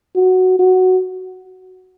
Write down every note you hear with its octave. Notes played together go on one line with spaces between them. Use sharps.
F#4
F#4